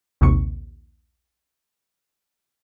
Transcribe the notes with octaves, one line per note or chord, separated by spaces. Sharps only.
A#1 D#2 C3 C#6